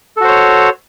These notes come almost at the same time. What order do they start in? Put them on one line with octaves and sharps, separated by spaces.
A4 F#4 C5 C#5